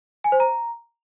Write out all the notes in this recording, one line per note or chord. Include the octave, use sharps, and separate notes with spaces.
G#5
C5
A#5